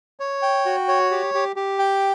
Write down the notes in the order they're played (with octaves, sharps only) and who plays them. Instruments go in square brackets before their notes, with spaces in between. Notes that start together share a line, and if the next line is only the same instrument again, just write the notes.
[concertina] C#5
G5
F#4
C#5
G4
G4
G4
G5